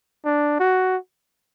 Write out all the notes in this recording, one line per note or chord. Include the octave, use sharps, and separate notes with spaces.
D4
F#4